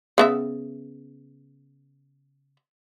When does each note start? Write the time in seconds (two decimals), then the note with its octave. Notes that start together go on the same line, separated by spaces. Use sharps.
0.18 C#3 B3 E5